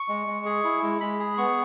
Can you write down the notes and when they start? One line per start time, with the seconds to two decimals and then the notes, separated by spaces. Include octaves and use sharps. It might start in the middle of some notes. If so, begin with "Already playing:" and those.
Already playing: C#6
0.09 G#3
0.27 G#3
0.45 G#4
0.64 E4
0.82 G#3
1.01 G#3 B5
1.19 G#4
1.38 B3 C#6